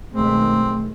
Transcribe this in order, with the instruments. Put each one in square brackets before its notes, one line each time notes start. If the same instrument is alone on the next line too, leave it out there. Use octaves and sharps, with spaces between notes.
[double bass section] B1 D#3 G#3 [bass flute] A3 [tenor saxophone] C4